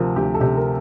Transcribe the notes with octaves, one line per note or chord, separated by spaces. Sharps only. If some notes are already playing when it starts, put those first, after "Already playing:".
Already playing: D2 C3 F3 A#4 A5
D2 G4
A4
C3 G4
A#4